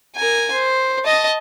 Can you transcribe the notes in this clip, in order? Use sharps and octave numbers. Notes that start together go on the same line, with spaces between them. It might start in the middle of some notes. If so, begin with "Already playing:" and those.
A#4 G#5
C5
D#5 A5